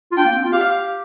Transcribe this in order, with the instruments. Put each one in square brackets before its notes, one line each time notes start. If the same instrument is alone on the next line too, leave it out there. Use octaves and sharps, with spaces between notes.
[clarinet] F4
[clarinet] D4 [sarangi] G5
[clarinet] A#3
C4
F4
[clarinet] G4 [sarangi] F5